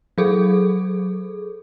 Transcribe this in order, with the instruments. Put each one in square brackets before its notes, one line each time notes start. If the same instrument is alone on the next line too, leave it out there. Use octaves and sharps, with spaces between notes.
[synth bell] F#3 G#4 A4